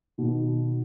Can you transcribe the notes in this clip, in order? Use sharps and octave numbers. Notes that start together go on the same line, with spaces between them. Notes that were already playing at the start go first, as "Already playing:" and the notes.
B2 D#3